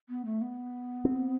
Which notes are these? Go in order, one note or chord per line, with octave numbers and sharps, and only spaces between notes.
B3
A3
B3
C4